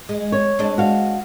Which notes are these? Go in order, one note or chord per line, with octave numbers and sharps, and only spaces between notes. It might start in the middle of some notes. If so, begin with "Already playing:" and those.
G#3
C#5
G#3 C4 D4
F#4 F5